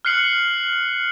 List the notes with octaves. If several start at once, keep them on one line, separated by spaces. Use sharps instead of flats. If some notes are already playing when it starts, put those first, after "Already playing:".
F6 F#6 C7 C#7 F#7